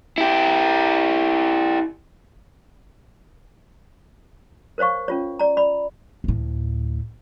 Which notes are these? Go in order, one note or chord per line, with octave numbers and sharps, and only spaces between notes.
E4 G4
A#4 C5 C#5 F5 C#6
C#4 F4 C#5
D5 A#5
D5 B5
D2 A2